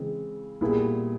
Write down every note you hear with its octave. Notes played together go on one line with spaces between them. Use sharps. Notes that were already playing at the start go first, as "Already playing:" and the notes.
Already playing: C#3 E3 G#3 C4
A#2 G3 B3 E4 G#4